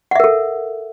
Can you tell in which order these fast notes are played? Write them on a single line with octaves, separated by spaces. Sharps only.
F#5 E5 A#4 A4